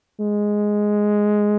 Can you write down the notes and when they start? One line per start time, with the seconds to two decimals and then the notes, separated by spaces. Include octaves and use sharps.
0.20 G#3